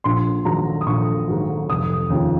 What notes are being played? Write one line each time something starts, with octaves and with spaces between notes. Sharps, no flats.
A#1 C6
G#2 D#3 F#3 A#5
D#6
A#1 C#6
G#2 D#3 F#3
F1 D#6
D#2 C#3 F3